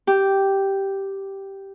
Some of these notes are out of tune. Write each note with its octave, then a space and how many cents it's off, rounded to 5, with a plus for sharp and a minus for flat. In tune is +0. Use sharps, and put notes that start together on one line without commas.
G4 -5